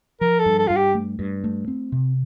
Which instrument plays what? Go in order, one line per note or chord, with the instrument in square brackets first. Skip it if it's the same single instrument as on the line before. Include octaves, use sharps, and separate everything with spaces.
[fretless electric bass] F3 [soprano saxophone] A#4
[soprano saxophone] A4
[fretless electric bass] G2
[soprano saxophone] A4
[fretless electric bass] G2 [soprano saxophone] F4
[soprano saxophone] G4
[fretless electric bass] A3
G2
A3
C4
C3